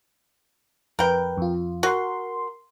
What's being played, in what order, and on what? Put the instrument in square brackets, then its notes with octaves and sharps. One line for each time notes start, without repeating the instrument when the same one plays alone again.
[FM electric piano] F2 B4 [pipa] A#4 G5
[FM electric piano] F2 F4
[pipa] F#4 [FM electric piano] A#4 C6